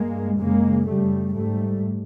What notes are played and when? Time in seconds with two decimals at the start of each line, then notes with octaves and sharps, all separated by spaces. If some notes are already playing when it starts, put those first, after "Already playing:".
Already playing: G2 G#3 A#3
0.39 F#2 C#3 G#3 A#3
0.87 F#2 C#3 G3 A3
1.35 G#2 G3 A3